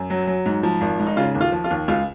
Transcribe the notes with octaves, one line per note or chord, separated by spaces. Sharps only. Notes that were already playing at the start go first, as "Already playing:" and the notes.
Already playing: F#2
F#3
F#3
G#2
F3
G#1
G#2
D#4
C#3 F4
D#2
F4
F3
F4
D#2
C#2 F4